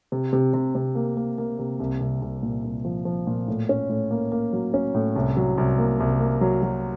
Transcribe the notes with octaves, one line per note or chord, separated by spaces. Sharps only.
C3
C3
C3
C3
A#3
A#3
A#3
C3
C2
C2
C2
A#2
C2
F3
F3
A#2
A2
C#4
A2
A#3
A#3
F#3
C#4
A2
C2
F#3
C2
A#3
C2
A#3
F#3
F#3